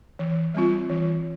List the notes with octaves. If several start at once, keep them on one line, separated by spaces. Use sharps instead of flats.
E3
G3 C4 F4
E3